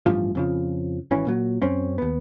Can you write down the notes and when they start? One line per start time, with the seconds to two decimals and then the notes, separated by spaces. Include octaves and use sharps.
0.06 A1 G2 F3
0.35 F2 C#3 F3
1.11 G#1 E3 C#4
1.27 A#2 F#3
1.62 F#2 C4 C#4
1.98 D#2 B3